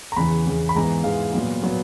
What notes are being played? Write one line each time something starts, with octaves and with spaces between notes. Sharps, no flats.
A#5
E2 C#3 E3 B5
E2 C#3 E3
B5
G#2 E3 G#3 B3 A#5
G#2 E3 G#3 B3 F5
A#2 F#3 B3
A#2 F#3 B3